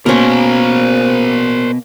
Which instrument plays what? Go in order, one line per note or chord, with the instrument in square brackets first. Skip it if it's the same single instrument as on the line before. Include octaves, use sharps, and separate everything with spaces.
[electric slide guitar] B2 [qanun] A#3 C#4 [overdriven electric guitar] A#4 C5